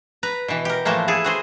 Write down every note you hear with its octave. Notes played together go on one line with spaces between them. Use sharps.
B4 A#5
B2 E3
G4 A#4
A2 E3 F3 A3 A#3
E4 G#4 A4
F#4 G#4 C5